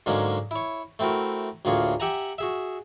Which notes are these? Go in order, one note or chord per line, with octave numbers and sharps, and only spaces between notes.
G#2 D3 F#3 G#3 A#3 C#4
E4 C#5
A3 C4 E4 F#4 A#4
D2 A2 A#3 F4 G#4 C#5
G4 E5 F#5 G#5 A#5
F#4 G#4 E5